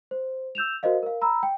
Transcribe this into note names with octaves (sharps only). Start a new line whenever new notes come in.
C5
E6 G6 E7 F7
F#4 A#4 C5 D#5 F5
A#4 F5
A#5 B5 E6
G5